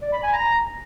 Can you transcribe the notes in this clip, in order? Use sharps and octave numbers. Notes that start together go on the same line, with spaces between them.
D5
B5
G#5
A#5